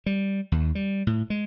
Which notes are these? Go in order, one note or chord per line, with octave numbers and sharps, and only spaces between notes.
G3
D#2
G3
A2
G#3